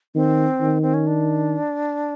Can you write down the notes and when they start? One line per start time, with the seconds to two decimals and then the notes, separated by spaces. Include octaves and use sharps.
0.15 D#3 C4
0.61 D#3
0.82 C4
0.94 C#4
1.07 D4